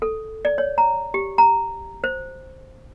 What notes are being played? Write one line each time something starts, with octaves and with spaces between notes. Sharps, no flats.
A4
D5
C#5
A#5
G4
A#5
C5